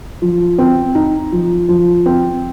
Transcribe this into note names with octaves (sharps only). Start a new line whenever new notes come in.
F3
C4
D#4
F3
F3
C4